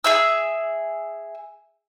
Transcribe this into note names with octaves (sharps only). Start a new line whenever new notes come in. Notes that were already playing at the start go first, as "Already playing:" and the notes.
G#4 E5 E6